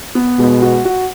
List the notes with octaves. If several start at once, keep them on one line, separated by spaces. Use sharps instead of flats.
B3
B2 G#3
F#4
F#4